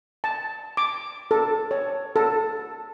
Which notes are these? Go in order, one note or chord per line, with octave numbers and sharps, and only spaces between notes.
A5
D6
A4
C#5
A4